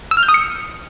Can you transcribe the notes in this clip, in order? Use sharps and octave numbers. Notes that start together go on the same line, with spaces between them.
E6
F6
G6
D#6
C#7